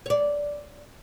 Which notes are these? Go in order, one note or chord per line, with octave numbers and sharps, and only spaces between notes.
C#5 D5